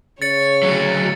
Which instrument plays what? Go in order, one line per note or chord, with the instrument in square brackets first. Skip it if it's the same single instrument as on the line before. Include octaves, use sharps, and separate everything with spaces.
[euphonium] C#3 [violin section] C#5 [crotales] A6 C#7
[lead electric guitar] D2 F#3